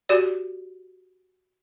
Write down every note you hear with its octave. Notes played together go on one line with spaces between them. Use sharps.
F#4 G4 D5